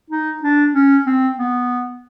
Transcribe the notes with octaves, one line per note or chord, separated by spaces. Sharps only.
D#4
D4
C#4
C4
B3